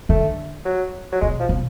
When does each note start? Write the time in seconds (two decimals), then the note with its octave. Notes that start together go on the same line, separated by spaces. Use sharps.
0.09 D3 A3
0.65 F#3
1.12 F#3
1.21 B2 G#3
1.40 F3
1.49 B2